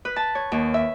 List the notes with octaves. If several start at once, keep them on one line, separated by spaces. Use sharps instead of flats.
B4
A5
C#5
D#2
E5